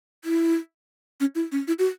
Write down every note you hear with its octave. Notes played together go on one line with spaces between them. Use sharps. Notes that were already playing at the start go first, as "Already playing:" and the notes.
E4
C#4
E4
C#4
E4
F#4